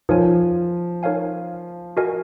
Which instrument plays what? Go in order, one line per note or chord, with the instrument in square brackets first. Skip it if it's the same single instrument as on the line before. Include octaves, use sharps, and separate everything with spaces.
[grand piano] F3 [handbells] D#4 A#4 C#5 G#5
[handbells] D#4 A#4 C#5 F5 G#5
F#4 A#4 D#5 G#5